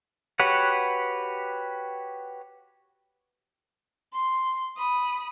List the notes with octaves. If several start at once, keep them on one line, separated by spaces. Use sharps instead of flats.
F#4 G4 B4 C#5 F#5
C6
B5 D#6